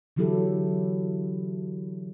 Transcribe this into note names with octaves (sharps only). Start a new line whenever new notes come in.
D3 E3 F#3 E4 G4 A4